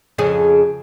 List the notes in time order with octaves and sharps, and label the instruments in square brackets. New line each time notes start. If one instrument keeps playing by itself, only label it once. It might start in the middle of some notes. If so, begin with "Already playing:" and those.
[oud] F2 C#3 G#4